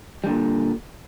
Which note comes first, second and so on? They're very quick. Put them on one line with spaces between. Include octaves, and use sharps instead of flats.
G3 D3 A#2